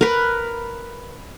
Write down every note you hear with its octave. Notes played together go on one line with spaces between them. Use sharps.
A#4 B4